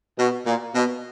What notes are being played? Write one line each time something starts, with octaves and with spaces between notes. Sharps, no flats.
B2
A#2
B2